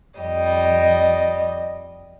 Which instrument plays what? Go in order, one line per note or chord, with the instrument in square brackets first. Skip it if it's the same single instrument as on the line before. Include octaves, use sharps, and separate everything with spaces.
[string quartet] F2 G3 D#5